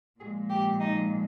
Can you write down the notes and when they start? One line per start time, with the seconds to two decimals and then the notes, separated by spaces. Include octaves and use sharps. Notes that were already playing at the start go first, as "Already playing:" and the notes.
0.19 A#2 F3 G#3 G#4
0.49 G4
0.79 D#4